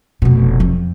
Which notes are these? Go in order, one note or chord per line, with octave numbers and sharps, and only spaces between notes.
F1 B2
F2